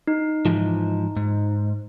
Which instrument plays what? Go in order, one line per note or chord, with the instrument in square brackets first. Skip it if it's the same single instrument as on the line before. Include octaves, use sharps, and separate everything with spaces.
[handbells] D#4
[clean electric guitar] G#2 E3 F3
G#2